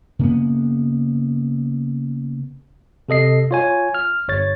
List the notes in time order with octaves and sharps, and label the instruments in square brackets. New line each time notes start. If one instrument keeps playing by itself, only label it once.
[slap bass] C#3 A#3 B3
[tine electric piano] C3 A4 D#5 C7
F4 C#5 G#5
F6
G1 C#5 A6